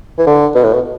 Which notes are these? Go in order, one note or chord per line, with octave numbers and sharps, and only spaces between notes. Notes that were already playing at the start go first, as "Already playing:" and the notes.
E3
D3
B2
A2
B2